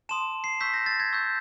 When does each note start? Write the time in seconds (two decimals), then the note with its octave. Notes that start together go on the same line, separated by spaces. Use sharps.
0.09 A5 C6 D#6 E7
0.44 C7
0.61 C#6 E6 G6 B6
0.74 A#6
0.86 A6
1.00 G#6
1.12 C#6 E6 G6